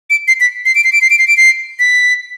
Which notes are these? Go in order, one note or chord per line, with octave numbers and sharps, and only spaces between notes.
D7
C7
B6
C7
D7
C7
D7
C7
D7
C7
D7
C7
B6